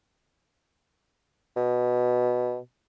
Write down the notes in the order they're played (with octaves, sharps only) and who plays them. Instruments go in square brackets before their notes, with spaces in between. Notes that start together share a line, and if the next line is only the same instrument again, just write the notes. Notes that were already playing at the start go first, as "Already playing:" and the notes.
[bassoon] B2